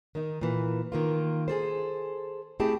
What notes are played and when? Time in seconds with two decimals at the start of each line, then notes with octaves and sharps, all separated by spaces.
0.15 D#3 D#4
0.41 A#2 E3
0.92 D#3 A#3 F4
1.48 G#4 A4 C5
2.59 A3 C4 E4 G4 G#4 A5